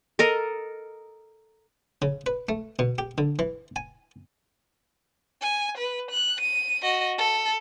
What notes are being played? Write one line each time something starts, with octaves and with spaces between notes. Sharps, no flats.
A4 A#4 D#5
C#3
B4
A3
B2
G4
D3
E3
G#5
G#5
B4
F#6
D#7
F#4 D#5
A4